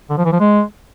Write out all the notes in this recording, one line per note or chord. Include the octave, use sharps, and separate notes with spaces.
D3
F3
E3
F3
G#3